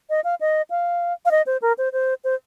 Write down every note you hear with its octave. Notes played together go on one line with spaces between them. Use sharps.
D#5
F5
D#5
F5
F5
D#5
C5
A#4
C5
C5
C5